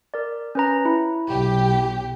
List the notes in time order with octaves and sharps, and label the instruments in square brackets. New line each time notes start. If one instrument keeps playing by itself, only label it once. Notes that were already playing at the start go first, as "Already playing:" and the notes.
[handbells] A#4 D5
C#4 B4 A#5
E4
[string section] B1 G4